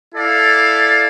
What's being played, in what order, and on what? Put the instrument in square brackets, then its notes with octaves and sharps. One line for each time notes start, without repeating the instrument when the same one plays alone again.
[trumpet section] E4 A4 D5 F5